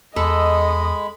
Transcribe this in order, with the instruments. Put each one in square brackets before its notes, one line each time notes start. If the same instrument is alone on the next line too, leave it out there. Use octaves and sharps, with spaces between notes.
[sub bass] E2 [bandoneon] G#3 B5 [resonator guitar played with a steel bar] A4 [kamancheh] D#5 D#6